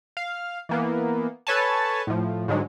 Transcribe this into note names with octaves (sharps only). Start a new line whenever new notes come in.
F5
E3 A#3 B3
A4 B4 C#5 G#5 A5
A2 F3
G#2 D3 F#3 G#3